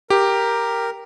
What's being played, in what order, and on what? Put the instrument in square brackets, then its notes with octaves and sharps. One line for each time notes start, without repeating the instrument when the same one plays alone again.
[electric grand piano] G4 [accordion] A#4